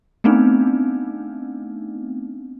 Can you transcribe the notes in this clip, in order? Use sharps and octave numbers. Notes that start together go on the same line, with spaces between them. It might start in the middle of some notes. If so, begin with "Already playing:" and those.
A3 B3 C4 D4 D#4